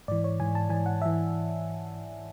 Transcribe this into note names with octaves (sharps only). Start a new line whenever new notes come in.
G#2 E3 D5
C#5
G#2 E3 G#5
A5
G#2 E3 G#5
F#5
E5
E3